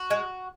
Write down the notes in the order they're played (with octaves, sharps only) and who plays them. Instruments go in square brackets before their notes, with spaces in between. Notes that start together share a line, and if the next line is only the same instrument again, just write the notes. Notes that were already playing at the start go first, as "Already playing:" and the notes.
Already playing: [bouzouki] F#4
G#3